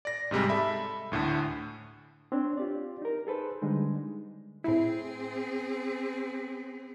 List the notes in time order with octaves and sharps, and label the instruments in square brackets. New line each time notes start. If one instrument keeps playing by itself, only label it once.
[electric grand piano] D5 A#6
G#2 C3 G3 G#3
A4 E5 B5
D2 A2 D3 A3
[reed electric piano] C4 D4 C#5
F4 G4 D5
D#4 A#4
G#4 A4 B4 C5
D3 G3 G#3 D#4
[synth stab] A2 E4 [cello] C4 G#4